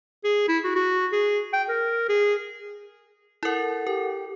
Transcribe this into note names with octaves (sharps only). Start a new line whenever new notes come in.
G#4
E4
F#4
F#4
G#4
G5
A#4
G#4
E4 A4 A#4 F#5
G4 A#4